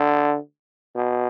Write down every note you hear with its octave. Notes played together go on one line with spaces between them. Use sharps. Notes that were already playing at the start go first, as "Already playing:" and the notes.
Already playing: D3
B2